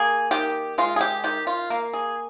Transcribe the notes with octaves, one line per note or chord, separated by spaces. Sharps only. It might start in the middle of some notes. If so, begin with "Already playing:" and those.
Already playing: A#3 G#4
D#3 G4
G#3 F4
G#4
G4
D#3 G4
F4
A#3
G#4